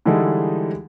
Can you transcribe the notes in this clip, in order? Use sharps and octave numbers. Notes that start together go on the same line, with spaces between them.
D3 E3 G3 G#3 D#4 A4